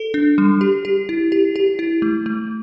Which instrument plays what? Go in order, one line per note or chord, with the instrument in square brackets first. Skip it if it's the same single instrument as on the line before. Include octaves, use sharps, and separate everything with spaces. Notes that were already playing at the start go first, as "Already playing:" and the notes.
Already playing: [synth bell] A4
D4
G3
G4
G4
E4
G4
G4
E4
A3
A3